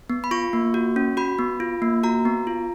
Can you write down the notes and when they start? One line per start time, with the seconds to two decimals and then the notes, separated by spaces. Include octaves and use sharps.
0.10 B3
0.24 B5
0.31 F4 C#6
0.53 A#3
0.74 F#4
0.96 C#4
1.17 F#4 B5
1.39 B3
1.60 F4
1.82 A#3
2.03 F#4 A#5
2.25 B3
2.47 F4